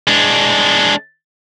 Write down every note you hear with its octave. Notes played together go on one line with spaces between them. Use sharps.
G#3 D4